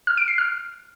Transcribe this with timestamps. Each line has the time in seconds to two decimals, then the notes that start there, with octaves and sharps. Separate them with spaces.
0.07 F6
0.18 D7
0.28 C7
0.38 F6